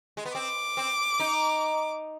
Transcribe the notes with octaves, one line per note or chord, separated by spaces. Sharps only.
G#3
B3
C4 D6
C4
D#4